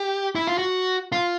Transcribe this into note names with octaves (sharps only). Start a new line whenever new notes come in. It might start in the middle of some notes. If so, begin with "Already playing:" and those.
Already playing: G4
E4
F4
F#4
F4